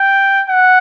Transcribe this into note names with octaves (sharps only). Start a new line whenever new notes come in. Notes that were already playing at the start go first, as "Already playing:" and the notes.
Already playing: G5
F#5